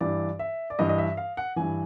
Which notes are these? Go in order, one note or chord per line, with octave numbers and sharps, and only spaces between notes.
G2 E3 D5
E5
D5
G2 E3 D#5
D#5
E5
F5
F#5
G2 E3 G#5